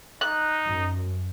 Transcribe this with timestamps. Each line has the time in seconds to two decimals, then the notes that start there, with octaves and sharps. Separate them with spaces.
0.21 D#4 F#6
0.65 F#2